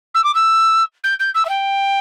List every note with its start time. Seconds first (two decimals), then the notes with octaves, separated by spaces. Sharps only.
0.14 E6
0.24 D6
0.34 E6
1.03 G6
1.19 G6
1.34 E6
1.45 E5
1.49 G5